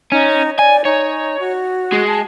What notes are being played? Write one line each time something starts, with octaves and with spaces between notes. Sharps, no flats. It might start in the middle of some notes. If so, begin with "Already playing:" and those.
C#4 D#4
D5 G#5
D#4 C#5
F#4
G#3 G#4
A5